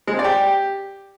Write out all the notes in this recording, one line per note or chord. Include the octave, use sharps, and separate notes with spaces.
G#3
C4
D5
G4